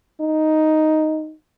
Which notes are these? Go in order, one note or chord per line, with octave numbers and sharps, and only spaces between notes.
D#4